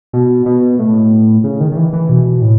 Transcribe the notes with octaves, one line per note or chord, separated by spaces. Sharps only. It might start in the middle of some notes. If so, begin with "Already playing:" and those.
B2
B2
A2
C#3
D#3
D#3
E3
E3
B2
A2